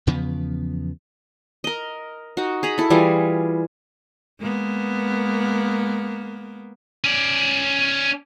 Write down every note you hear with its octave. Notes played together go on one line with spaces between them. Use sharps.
E2 C#3 F3 B3
A#4 D#5
D#4 F#4
G#4 A#5 B5
E4 A4
E3 G3 F4 G#4
G#3 A#3 B3
C#4 D5